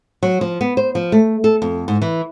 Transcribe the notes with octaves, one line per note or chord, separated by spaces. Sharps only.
F#3
F3
B3
C5
F3
A3
A4
F2
G#2
E3